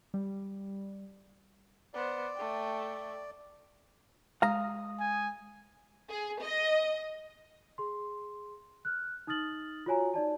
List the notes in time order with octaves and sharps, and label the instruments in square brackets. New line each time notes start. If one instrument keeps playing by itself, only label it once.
[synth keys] G3
[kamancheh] B3 C5 [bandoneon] D5
[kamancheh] A3 G5
[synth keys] G#3 D#6 [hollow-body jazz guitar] F5 A#5
[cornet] G#5
[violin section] G#4
D#5
[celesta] G#4 C6
F6 F#6
D#4 D#6 F6 A6 F#7
F4 F#4 C#5 G#5 A#5
D#4 D5 A5